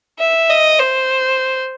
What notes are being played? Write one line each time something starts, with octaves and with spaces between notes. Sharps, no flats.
E5
D#5
C5